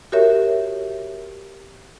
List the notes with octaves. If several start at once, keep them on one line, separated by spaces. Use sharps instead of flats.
F#4 G4 A#4 C#5 E5